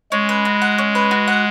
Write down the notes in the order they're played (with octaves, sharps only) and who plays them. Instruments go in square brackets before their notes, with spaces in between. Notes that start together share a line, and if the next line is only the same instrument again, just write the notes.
[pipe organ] G#3 [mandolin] C#4
[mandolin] B4
F#4
F#5
C#4
B4
F#4
F#5